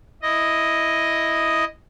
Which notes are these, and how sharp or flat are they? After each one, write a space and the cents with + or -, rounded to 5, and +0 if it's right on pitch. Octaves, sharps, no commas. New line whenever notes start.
E4 +0 D#5 +0